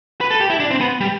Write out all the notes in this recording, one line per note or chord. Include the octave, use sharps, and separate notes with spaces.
B4
A4
G4
E4
D4
C4
B3
G3